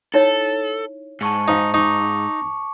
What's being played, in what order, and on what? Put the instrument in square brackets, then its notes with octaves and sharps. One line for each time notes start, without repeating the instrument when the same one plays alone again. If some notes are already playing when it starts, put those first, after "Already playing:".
[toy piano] D#4 E4 C#5 [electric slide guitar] A4
[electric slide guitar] G#2 [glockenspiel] A5 C#6 C#7
[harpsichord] D#4 [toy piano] F#4 C5 F5
[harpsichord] D#4 [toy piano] A#5 [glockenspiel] C#6 D6